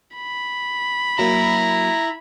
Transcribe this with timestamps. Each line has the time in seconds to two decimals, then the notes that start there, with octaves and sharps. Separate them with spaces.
0.16 B5
1.19 F#3 A#3 E4 A#5